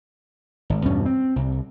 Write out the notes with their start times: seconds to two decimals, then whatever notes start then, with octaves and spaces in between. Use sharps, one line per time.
0.70 G#1
0.85 E2 G2 B2 C#4
1.06 C4
1.36 C2